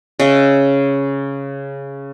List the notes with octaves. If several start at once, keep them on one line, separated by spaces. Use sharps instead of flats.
C#3 D#5 E5